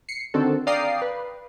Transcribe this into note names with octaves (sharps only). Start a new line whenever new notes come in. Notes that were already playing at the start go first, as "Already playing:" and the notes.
C7 C#7
D3 D#3 C4 D4 F#4 A4
D5 F5 G5 A#5 D#6 C7
B4